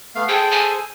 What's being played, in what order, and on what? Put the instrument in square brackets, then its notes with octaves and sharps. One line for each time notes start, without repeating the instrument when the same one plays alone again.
[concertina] A3 B3 F5
[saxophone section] G#4 [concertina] A4 C5 [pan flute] G5
[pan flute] G#5